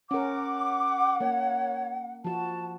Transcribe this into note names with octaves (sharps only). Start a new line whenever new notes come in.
C#4 A#4 F#5 D6
A#3 C#5
F3 F#4 A5